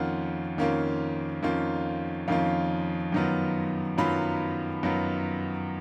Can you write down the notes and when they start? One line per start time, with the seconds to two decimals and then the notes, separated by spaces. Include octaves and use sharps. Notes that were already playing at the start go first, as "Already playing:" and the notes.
Already playing: F2 D#3 A#3 C#4 F4 F#5
0.58 F2 D#3 A#3 C#4 F4
1.43 F2 D#3 A#3 C#4 F4
2.28 F2 D#3 A#3 C#4 F4 F5
3.12 F#2 D#3 F#3 B3 F4
3.98 F#2 D#3 F#3 B3 F4 B5
4.83 F#2 D#3 F#3 B3 F4